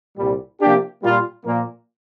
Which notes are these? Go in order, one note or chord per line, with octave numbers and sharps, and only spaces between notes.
C2 A#2 G3
C3 F3 A#3 D4 G4
A#2 G3 A#3 F4
A#2 F3 A#3